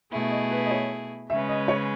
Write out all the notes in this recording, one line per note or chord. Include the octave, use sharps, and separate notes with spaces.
B2 A3 E4 G#4 E5
D#5
B4
D#5
C#5
C#3 G#3 C#4 G#4 B4 E5
D#5
C#5